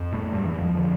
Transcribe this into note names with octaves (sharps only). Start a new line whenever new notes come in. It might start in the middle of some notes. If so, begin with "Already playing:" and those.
Already playing: F2
A2 A3
G2 G3
E3
F2 F3
F2 D3